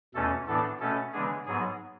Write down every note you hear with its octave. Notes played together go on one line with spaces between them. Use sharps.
E2 B2 A3 C#4 A4
A2 E3 B3 D4 A4
B2 A3 C#4 A4
C#3 E3 G#3 B3 D4 G#4
G#2 F#3 B3 G#4